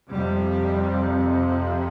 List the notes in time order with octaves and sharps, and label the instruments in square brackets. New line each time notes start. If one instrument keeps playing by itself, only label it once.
[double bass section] F2 C3 G3